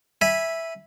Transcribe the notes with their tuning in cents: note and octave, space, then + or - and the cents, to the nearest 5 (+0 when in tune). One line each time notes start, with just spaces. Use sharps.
E5 +0 G#5 -10 B5 -10